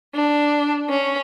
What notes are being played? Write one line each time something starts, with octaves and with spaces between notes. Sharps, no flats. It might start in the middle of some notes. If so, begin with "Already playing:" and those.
D4
C#4